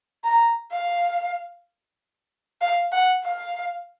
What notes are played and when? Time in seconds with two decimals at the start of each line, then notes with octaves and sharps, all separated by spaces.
0.24 A#5
0.71 F5
2.61 F5
2.92 F#5
3.24 F5